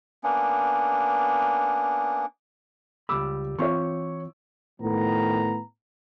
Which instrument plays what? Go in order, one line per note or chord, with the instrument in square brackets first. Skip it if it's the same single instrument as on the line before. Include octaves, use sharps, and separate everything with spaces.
[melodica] A#3 B3 C#4 D4
[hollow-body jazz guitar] C#2 G3 B5 [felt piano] D6 E6
[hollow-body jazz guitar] E3 C4 F4 [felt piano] C#5 C#6
[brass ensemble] A2 D#3 F3 B3 A#5